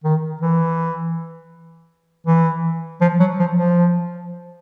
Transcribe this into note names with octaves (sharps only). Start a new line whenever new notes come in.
D#3
E3
E3
F3
F#3
F3
F3